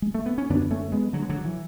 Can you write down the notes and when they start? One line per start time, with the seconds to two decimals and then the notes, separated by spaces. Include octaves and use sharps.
0.02 G#3
0.15 A3
0.26 B3
0.38 C#4
0.50 F#2 D3 B3 D4
0.71 A3 C#4
0.92 G#3 B3
1.13 D3 F#3
1.22 G#3
1.29 D3 F#3
1.45 E3